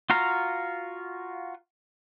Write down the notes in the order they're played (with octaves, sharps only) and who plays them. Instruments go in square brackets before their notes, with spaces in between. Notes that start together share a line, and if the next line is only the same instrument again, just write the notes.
[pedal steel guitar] F4 F#4 F5 A#5